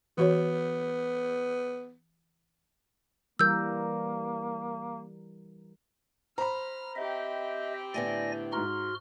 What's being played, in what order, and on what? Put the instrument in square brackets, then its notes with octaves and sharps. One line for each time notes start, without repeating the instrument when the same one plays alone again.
[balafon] E3 F#4 C#5 [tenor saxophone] B3
[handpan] E3 G3 A#4 [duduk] A#3 [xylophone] E6 G6
[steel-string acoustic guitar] C5 [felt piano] A#5 B5 [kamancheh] F6
[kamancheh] C4 G4 [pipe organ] D#5 E5
[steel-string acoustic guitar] A2 D3 B3 [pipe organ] D5 G#5 A#6
[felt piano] G#2 A#5 [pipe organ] F#4 C6 F6